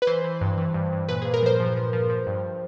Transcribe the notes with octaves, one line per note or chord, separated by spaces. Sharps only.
B4
E3 C5
E3
G2
E3
G2
G2
A#2 B4
A#2 G#4
A#4
F3 C5
F3
F3
F3
F3
G2